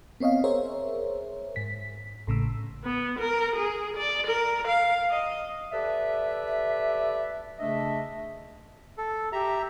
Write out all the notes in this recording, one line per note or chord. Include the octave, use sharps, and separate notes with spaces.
B3 C4 C#5 D#5 F5
G#4 A#4 C5 C#5 E5
G#2 B6
A1 A2 C#3 E6
B3
A#4
G#4
D5
A#4
F5
D#5
G4 A4 B4 D5 E5
C#3 A3 D4 D#5 E5
A4
G4 E5 A#5